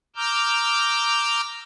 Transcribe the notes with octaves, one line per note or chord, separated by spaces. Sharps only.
A#5 D6 E6 F6 G6